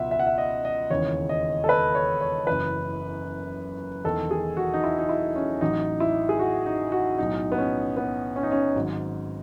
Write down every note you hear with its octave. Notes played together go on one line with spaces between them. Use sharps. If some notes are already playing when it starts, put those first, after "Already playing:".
Already playing: C#2 B2 F#3 E5 F#5
E5
F#5
E5
D#5
D#5
E1 D#2 C#3 E3 C#5
D#5
A4
B4
C#5
C#5
F#1 F#2 E3 B4
E1 E2 D#3 A4
G#4
F#4
D#4
E4
D#4
E4
C#4
A1 A2 F#3 D#4
E4
G#4
F#4
D#4
F#4
B1 A2 F#3 D#4
B3
C#4
B3
C#4
D#4
C#4
G#1 G#2 F#3